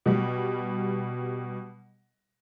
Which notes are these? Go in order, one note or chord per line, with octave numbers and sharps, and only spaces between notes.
B2 G3